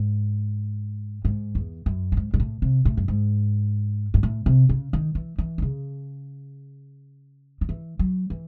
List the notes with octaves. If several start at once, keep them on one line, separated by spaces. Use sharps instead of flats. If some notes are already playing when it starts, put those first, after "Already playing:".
Already playing: G#2
G#2
E2
F#2
A2
G#2
G#2
A2
C3
A2
F#2
G#2
G#2
A2
C3
C#3
D#3
E3
E3
C3
C#3
D#3
E3
F#3
E3